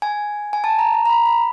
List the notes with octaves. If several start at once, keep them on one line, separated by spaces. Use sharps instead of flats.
G#5
G#5
A5
A#5
A#5
A#5
B5
B5